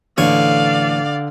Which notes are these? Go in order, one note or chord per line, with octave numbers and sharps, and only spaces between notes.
A1 D3 C#5 D5 F5